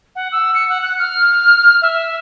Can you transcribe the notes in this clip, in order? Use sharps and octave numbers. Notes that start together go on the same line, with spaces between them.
F#5
E6
C#7
F#5
F#6
F6
E5